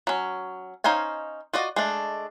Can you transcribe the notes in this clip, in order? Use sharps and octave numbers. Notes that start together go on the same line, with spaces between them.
F#3 C#4
C#4 D#4 C5 F5 G#5
F4 F#4 D5 D#5
G#3 A3 D4